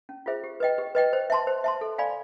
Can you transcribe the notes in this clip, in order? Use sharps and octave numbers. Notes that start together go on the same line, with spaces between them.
C#4
F4 G#4 C5 E5
G4
B4 D#5 G5
G4
B4 D#5 G5
C5
E5 A5 C6
C5
E5 A5 C6
A4
D5 F5 G#5 B5